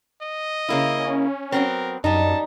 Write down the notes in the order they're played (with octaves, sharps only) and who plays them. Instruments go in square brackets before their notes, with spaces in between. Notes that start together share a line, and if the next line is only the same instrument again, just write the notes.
[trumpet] D#5
[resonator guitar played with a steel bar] C#3 A#3 E4
[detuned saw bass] C#4
[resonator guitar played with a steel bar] F#3 B3 C4 [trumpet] A#4
[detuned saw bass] F#2 [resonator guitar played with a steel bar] G3 D#4 [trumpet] A5